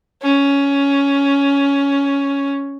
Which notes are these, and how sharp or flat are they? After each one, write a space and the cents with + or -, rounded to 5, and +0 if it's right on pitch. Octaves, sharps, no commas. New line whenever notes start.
C#4 +10